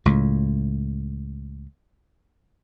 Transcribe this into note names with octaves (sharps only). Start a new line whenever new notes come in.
C#2 A2